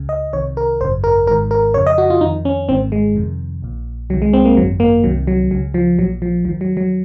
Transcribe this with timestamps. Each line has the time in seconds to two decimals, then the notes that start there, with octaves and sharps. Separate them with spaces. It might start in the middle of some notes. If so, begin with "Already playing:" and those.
Already playing: C#2 C#3
0.09 D#5
0.33 C2 C3 D#3 C#5
0.57 A#4
0.81 G#1 F#2 C#3 C5
1.04 A#4
1.27 G#1 G#2 D#3 A#4
1.51 A#4
1.74 F2 C#3 C#5
1.86 D#5
1.98 F#4
2.10 F4
2.21 F2 D#3 D#4
2.45 C#4
2.69 G#1 G#2 D#3 C4
2.92 G#3
3.15 F2 C3 D#3
3.62 A#1 A#2
4.10 C2 C3 D#3 F#3
4.22 G#3
4.33 C4
4.45 A#3
4.57 G#1 F#2 D#3 F#3
4.80 A#3
5.04 C2 C3 D#3 F#3
5.27 F#3
5.51 C#2 C#3 F#3
5.74 F3
5.98 A#1 A#2 F#3
6.22 F3
6.45 D#2 D#3 F3
6.61 F#3
6.77 F#3